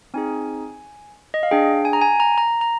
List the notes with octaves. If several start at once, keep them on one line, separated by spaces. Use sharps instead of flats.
C4 D#4 G#4 G#5
D#5
F5
D4 G#4 G5
G#5
A#5
G#5
A#5
A#5
A#5